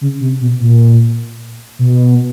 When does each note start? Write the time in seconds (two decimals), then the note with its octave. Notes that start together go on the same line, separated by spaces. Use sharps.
0.01 C#3
0.21 C3
0.41 B2
0.60 A#2
1.79 B2